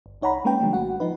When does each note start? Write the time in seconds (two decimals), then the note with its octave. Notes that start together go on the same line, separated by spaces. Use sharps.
0.06 G1
0.22 C2 D#4 C#5 F#5 A#5 B5
0.45 G#3 A#3 C#4 B4 G5
0.60 D3 F3 G3 A3
0.73 G#1 F#4 F#5
1.00 F3 D#4 B4